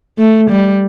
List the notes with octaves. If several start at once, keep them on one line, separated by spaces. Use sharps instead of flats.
A3
G3